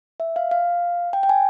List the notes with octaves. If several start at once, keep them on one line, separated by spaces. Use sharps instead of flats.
E5
F5
F5
G5
G5
G#5